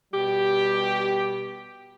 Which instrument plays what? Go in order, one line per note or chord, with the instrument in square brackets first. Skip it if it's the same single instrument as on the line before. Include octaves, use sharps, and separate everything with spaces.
[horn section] B2 G3 G4